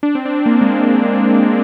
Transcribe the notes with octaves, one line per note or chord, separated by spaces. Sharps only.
D4
C4
D4
C4
A#3
G#3